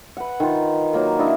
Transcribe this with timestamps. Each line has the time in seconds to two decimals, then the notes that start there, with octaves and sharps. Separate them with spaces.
0.17 B4 F#5
0.40 D#3 F4
0.93 F#3 A#3 A#4
1.19 D4 E4 D5 D#5